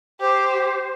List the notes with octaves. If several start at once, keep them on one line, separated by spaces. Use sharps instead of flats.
G4 C5